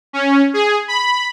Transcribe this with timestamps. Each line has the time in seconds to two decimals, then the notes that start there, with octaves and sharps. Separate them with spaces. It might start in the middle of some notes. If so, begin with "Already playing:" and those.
0.13 C#4
0.54 G#4
0.88 B5